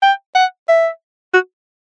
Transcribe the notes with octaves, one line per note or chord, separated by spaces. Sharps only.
G5
F#5
E5
F#4